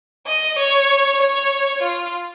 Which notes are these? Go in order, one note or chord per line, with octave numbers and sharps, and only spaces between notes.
D#5
C#5
C#5
F4